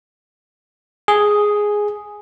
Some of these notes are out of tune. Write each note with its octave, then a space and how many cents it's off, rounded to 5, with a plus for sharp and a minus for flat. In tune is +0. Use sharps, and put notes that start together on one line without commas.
G#4 +0